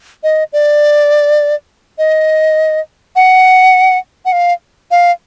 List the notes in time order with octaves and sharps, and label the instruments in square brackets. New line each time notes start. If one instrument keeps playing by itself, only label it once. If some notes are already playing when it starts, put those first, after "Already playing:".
[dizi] D#5
D5
D#5
F#5
F#5
F5
F5